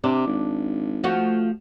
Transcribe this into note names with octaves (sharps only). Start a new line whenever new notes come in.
C3 D4
G#1
F3 A3 F#4